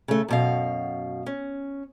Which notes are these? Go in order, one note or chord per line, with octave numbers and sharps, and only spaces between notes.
C#3 A3
F#2 B2 F5
C#4